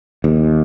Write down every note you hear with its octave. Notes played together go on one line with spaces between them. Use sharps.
D#2